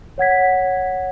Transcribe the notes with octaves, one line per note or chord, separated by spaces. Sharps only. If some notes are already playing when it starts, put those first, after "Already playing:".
C#5 F#5 G#6 B6